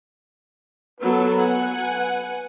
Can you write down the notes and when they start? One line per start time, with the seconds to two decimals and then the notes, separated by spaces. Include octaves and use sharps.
1.00 F#3 B3 A4 B4
1.37 F#5 G#5